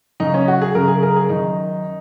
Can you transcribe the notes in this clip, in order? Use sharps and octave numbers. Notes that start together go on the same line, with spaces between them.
F#2 C#3 D#4
C#4
F#4
G#4
F#2 C#3 A#4
G#4
A#4
G#4
F#2 D#3 D#4